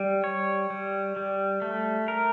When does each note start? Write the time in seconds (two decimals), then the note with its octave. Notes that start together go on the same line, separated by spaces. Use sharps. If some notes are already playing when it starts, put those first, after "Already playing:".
Already playing: G3
0.24 C#5
0.70 G3
1.16 G3
1.62 A3
2.08 A#4